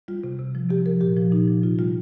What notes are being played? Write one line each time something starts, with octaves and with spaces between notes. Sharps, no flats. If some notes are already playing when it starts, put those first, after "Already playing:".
G3 F4
C3
C3
F3
C3 G4
F3 A#4
A#2 G4
F3
A#2 D#4
F3
C3 F4
G3 F4